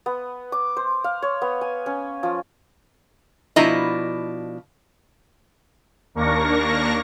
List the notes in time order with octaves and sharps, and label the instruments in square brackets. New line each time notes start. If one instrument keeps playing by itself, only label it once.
[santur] B3
D6
C5
F5
C#5
B3
G#5
C#4
F3
[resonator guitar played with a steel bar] B2 F3 D4 E4 D#5 A#5
[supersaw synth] D#2 A#3 D4 A#4 C#6 A#6